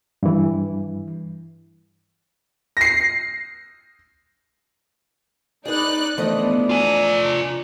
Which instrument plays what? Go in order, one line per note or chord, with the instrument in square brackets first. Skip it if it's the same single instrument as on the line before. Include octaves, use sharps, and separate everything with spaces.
[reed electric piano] G2 E3
[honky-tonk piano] A#6 C7
[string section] D#4 D5 F#6 [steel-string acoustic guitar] G#4 B4
[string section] E3 B3 [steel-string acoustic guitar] F3 A3 D#5 [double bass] D4
[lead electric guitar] F4 G#5 [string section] A#5